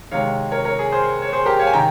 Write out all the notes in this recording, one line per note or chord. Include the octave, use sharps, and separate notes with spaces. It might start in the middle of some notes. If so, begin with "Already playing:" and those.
C3 D#3 G#3 C#5 F5
A#4 C#5
A#4 C#5
G#4
G#4 C5
C#5
G#4 C5
G4 A#4
C#5 F5
G#5
C3 D#3 G5 A#5